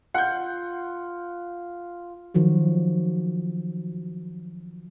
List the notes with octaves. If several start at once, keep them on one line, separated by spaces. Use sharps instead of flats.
F4 F#5 G6
D#3 F3 F#3 F#4